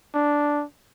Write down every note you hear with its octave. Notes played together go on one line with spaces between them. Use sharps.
D4